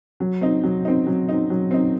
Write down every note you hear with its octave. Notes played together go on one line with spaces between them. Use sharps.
F#3
C4 D#4
F#3
C4 D#4
F#3
C4 D#4
F#3
C4 D#4